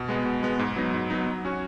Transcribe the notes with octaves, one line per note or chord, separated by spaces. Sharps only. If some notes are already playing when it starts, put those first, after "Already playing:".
Already playing: B2
G#3 B3
B2
G#3 B3
G#2
F#3 B3 D#4
G#2
F#3 B3 D#4
F#3
C#4 F#4 C#5